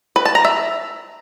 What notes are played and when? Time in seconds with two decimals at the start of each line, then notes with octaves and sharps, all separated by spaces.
0.16 B4
0.25 A5
0.35 A#5
0.45 E5